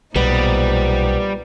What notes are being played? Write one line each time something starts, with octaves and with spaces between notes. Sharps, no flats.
B1 A#2 F3 G3 B3 D#4